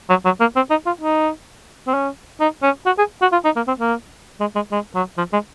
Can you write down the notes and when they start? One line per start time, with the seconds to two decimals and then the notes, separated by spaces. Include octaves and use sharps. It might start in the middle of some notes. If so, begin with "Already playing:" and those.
0.10 F#3
0.25 F#3
0.40 A#3
0.56 C4
0.70 D#4
0.86 F4
1.01 D#4
1.87 C4
1.94 C#4
2.40 D#4
2.63 C#4
2.86 F#4
2.98 G#4
3.22 F#4
3.32 F4
3.45 D#4
3.56 A#3
3.68 C4
3.80 A#3
4.40 G#3
4.56 G#3
4.72 G#3
4.95 F#3
5.18 F3
5.33 G#3